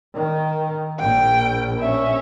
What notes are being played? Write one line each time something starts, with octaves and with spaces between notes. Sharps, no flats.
D#3
A#1 G5
C#4 E5